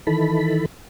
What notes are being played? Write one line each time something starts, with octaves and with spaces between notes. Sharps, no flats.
D#3 E3 A4 B5